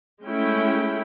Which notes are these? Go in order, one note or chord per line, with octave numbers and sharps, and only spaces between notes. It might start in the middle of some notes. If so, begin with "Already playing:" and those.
G#3 A3 C#4 E4 G5